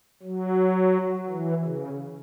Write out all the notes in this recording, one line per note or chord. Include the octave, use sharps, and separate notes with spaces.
F#3
E3
C#3